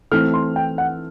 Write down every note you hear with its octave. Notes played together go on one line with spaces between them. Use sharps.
E3 A3 C4 E4 A4 F6
C6
G5
F#5